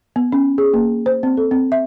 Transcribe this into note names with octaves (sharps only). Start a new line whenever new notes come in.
B3
C#4
G#4
A#3
C5
C4
A4
C4
E5